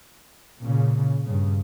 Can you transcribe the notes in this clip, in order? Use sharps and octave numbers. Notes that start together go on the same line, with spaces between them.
A#2 C#3
G2 C#3